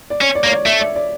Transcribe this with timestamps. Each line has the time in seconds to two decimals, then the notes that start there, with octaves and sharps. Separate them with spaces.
0.10 D5
0.21 C#4 C#5
0.35 D5
0.44 A#3 C#5
0.51 D5
0.65 A3 E5
0.80 D5
0.95 D5